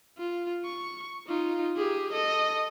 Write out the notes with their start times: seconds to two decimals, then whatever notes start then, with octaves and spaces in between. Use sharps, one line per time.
0.18 F4
0.65 C#6
1.27 D#4 F4
1.77 G4 G#4
2.13 A4 D#5